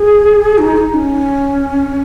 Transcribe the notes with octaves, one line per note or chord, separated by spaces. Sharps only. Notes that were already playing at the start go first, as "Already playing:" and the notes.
Already playing: G#4
D#4
D#4
C#4